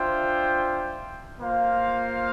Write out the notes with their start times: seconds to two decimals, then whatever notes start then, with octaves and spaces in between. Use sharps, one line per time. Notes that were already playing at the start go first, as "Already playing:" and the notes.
Already playing: D4 F4 C5 E5 G5
1.39 A#3 F4 C5 F5